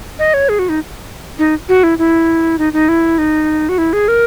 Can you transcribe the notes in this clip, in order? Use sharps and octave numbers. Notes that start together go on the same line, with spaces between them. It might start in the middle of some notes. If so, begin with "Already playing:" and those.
D#5
C#5
G#4
F#4
D#4
D#4
F#4
E4
E4
D#4
D#4
E4
D#4
F#4
E4
G#4
A#4